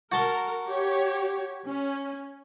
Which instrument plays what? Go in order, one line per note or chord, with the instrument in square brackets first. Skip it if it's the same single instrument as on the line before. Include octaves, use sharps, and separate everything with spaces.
[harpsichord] F#4 A5 C6 [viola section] A#4
[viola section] G4 C#5
C#4